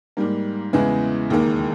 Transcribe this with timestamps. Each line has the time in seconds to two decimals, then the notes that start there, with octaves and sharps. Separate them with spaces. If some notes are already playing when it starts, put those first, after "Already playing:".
0.17 G#2 G3 A#3
0.73 E2 C#3 G#3 B3 E4
1.30 E1 D#2 D#3 A#3